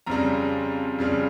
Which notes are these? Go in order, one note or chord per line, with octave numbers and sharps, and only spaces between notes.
F2 C#3 G3 A#5
F2 C#3 G3